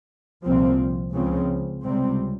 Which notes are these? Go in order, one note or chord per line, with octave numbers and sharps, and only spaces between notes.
C2 A#2 F3 C4
C#2 C#3 F3 C4
C#2 C3 G3 C4